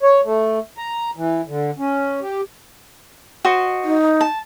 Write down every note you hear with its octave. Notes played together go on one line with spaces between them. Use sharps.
C#5
A3
A#5
E3
D3
C#4
G4
F#4 C5 D#5
D#4
A5